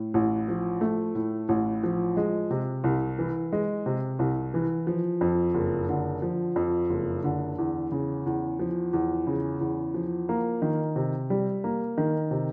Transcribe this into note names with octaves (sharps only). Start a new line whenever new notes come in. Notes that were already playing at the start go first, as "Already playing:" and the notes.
Already playing: A2
A1
F3
A3
A2
A1
F3
G#3
C3
C2
E3
G#3
C3
C2
E3
F3
F2
F#1
D3
F3
F2
F#1
D3
E2
C#3
E2
F3
E2
C#3
E2
F3
A#3
D#3
C3
G3
A#3
D#3
C3